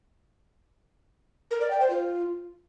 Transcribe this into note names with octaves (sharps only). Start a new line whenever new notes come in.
A#4
D5
G5
C5
F4